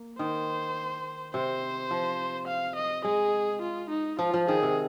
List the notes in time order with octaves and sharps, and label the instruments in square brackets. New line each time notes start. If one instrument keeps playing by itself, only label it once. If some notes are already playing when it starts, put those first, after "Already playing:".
Already playing: [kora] A#3
[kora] D#3 [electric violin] C5
[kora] C3 [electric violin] C5
[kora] F3
[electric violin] F5
D#5
[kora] G#3 [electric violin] G#4
[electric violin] F4
D#4
[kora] F3 [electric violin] F4
[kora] F3
[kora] D#3 [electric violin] G#4
[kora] C3